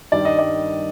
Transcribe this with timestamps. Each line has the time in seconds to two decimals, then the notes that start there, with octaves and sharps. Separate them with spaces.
0.12 G2 D#3 G3 D5
0.25 D#5
0.39 D5